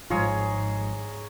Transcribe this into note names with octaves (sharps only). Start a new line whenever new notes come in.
G#1 G#2 F3 G#3 F4 G#4 C#5 A#5